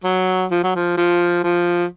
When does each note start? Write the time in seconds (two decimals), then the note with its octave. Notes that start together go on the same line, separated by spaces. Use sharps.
0.04 F#3
0.51 F3
0.63 F#3
0.75 F3
0.97 F3
1.44 F3